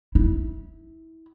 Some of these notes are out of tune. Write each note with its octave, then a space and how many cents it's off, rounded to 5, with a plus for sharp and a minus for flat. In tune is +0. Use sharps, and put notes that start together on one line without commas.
E4 -25